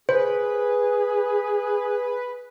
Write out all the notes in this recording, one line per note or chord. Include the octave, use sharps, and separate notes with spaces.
G#4 B4 C5